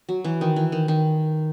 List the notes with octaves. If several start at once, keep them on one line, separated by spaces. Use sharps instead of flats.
F#3
E3
D#3
E3
D#3
D#3